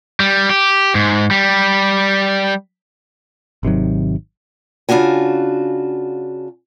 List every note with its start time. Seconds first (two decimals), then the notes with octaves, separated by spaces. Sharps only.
0.20 G3
0.50 G4
0.95 G#2
1.31 G3
3.63 G#1 C3 D#3 F#3
4.89 C#3 D4 F4 F#4 G#5